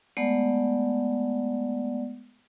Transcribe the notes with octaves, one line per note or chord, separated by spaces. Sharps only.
G#3 A3 B3 D5 F#5